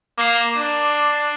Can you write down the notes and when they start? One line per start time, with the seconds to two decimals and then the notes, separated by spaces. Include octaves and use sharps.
0.18 A#3 D6 C7
0.57 D4